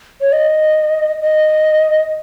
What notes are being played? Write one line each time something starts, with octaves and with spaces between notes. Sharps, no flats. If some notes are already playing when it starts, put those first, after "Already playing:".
C#5
D#5
D#5